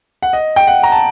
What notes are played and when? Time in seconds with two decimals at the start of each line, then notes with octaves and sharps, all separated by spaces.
0.22 F#5
0.33 D#5
0.56 G5
0.67 F#5
0.83 A#5
0.92 A5